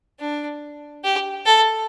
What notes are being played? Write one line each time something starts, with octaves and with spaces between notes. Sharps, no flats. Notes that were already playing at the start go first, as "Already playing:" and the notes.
D4
G4
A4